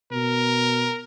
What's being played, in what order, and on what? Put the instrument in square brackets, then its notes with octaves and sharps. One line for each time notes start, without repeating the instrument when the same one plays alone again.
[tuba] B2 [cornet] A#4